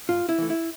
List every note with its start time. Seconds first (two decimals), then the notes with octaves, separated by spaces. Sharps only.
0.09 G2 F4
0.29 E4
0.38 E3 A3
0.50 E4